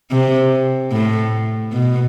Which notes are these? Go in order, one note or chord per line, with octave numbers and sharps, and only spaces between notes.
C3
A2
B2